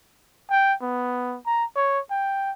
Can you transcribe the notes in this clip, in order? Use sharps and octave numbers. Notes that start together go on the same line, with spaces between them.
G5
B3
A#5
C#5
G5